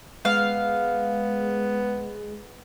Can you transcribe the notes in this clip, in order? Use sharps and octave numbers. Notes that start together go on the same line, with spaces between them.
G#3 B3 F5